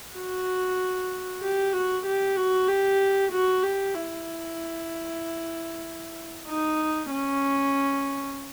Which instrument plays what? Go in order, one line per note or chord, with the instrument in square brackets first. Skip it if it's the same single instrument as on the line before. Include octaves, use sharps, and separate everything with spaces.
[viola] F#4
G4
F#4
G4
F#4
G4
F#4
G4
E4
D#4
C#4